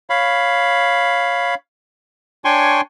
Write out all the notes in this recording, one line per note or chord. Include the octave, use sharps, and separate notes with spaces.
C#5 F5 B5
D4 C#5 G5 G#5 C6 C#6